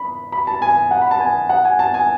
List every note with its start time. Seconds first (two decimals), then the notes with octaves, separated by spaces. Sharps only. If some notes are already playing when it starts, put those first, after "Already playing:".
Already playing: B5
0.32 B5
0.47 A5
0.62 G#5
0.91 F#5
1.01 B5
1.11 A5
1.20 G#5
1.49 F#5
1.65 G#5
1.79 A5
1.94 G#5